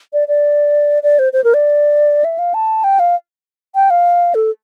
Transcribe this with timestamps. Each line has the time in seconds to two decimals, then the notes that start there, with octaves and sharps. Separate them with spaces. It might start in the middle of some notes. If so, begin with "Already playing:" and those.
0.13 D5
0.28 D5
1.03 D5
1.19 C5
1.33 C5
1.44 A#4
1.54 D5
2.24 E5
2.38 F5
2.54 A5
2.84 G5
2.99 F5
3.75 G5
3.90 F5
4.34 A4